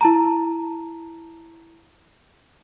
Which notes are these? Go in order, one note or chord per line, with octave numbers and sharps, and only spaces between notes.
E4 A5 A#5